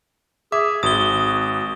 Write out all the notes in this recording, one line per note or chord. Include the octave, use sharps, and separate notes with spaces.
G#4 E5 D6
G#1 F#4 D#6 G7